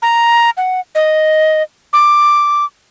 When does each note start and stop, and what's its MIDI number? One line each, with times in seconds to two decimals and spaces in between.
0.02 0.50 82
0.57 0.80 78
0.95 1.63 75
1.93 2.65 86